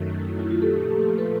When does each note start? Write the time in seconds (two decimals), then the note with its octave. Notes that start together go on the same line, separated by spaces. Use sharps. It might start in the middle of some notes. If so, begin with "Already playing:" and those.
Already playing: F#2 D#3 F#3 A3
0.28 E4
0.39 E4
0.51 F4
0.62 G4 A4
0.73 A#2 F3 A3
1.18 A4 B4